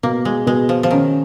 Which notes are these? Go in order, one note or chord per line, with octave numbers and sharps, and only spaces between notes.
B2 A#3
G#3
B2 G#3
F3
F3
D#3 C#4